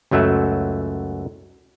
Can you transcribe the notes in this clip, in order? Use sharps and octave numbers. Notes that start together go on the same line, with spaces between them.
C#2 F#2 F#3 A3 E5